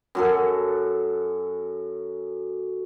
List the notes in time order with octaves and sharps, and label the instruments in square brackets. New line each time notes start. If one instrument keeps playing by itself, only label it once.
[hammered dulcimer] F#2 F#4 A4